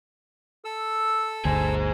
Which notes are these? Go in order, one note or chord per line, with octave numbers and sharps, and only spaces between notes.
A4 E6
G1 D2 G#4 C5